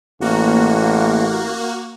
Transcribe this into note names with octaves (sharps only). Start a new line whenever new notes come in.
A1 A#3 F#4